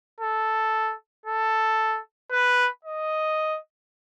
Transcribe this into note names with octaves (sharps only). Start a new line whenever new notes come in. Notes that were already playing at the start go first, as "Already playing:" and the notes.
A4
A4
B4
D#5